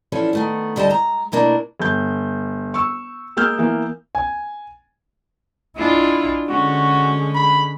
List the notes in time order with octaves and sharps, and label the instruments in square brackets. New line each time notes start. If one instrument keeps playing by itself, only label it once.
[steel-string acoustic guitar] E3 F3 C#4 D4 A4
D#3 A3 B3
D2 D3 G3 D#5 G5 A5
G#3 A#5
B2 A3 A#3 D4 E4
[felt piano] G1 G6
C#6 E6
G#3 A#3 E6 F6 G6
E3 A#3 B3
[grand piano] G#5
[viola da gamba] G#3 D4 F4 [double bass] E4
[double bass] D3 G#3 [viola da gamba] C#4 [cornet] F#4
[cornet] B5